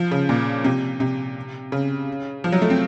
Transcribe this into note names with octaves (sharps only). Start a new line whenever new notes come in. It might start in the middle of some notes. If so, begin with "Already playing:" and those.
Already playing: F3
C#3
A#2
C3
C3
C#3
F3
F#3
A3
C4